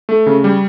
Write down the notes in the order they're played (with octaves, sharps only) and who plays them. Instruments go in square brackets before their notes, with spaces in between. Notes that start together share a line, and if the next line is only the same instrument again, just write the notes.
[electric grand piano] A3
C#3
G3